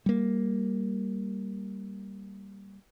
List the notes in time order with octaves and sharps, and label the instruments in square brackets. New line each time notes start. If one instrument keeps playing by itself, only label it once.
[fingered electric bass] G3 A#3